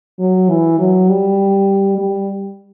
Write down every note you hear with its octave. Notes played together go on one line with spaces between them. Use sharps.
F#3
E3
F#3
G3
G3